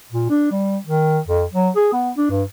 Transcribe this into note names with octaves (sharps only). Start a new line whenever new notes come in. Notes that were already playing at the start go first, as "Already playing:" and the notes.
A#2
D4
G3
D#3
F2
F#3
G#4
B3
D4
G2